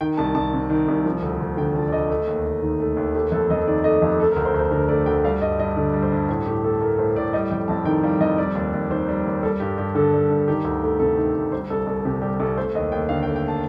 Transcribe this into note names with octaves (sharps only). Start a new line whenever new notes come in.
D#3 G5
C2 A5
C2 A5
C3
D#3
C2
F3
D2
D2
D3 G5
F3 A5
D5
D2 D#5
A3
D#2
D#2
D#3
A3
D#2
A3 G4
F2 A4
F2 D#5
D#3 D5
A3 D#5
F2 G4
A3 A4
A#4
D2
C5
D2
C5
D3 A#4
A3 D5
D2 G5
G3 F5
G2 D#5
G2 D#5
D3 D5
G3
C5
G2
A2 C5
A2 G4
A3 A4
A3 A#4
A2 C5
A2 D5
G3 D#5
F2 G5
F2 A5
D#3 G5
G3 F5
F2 D#5
G3 D5
D#2
D#2
D#3 C5
G3
D#2
G3 A4
G2 G4
G2 G4
D3 A4
G3
G2
D#3 G4
D2
A3
C3 A4
D#3
D2
G3 C5
C2 A4
C2 A4
C3 G4
G3 G4
C2 A4
A3 C5
D#2 D#5
D#2 G5
D3 F5
G5
A3
G5
A5